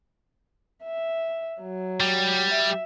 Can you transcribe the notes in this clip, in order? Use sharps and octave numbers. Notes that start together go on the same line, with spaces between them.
E5
F#3
G3
E5